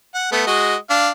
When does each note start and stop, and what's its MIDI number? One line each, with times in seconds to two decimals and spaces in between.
0.14 0.28 78
0.32 0.42 57
0.32 0.42 59
0.47 0.76 56
0.47 0.76 66
0.47 0.76 75
0.90 1.10 62
0.90 1.10 77